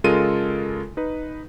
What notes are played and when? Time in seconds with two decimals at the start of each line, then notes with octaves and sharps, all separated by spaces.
0.04 C#3 G#3 F4 A4 A#4 D#7
0.97 D#4 B4